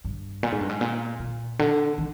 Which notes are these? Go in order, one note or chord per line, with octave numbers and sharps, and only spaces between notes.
G2
A#2
G#2
G2
G#2
A#2
A#2
D3
D#3